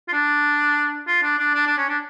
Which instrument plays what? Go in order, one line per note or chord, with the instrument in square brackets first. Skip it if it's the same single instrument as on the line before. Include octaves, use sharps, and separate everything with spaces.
[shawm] F4
D4
F4
D4
D4
D4
D4
C#4
D4